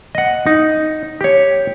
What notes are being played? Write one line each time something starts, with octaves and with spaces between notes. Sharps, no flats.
D#5 F#5
D#4
G4 C#5